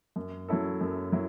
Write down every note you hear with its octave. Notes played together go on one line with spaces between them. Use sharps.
F#2
F#3 C#4 E4 A4
F#2
F#3 E4